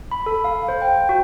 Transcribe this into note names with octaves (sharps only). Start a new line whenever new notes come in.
B5
A4
F5
C5
G5
F#4